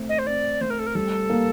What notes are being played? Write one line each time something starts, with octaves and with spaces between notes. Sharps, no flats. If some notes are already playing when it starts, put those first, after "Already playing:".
Already playing: A3 C4
D#5
C5
C4 D5
A3 C5
A#4
A4
A#4
G3 A4
A#3